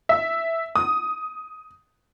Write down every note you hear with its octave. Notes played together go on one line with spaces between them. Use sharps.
E5
D#6